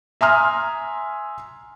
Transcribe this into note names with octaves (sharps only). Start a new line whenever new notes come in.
E5 G#5 A#5 C6 D#6 F6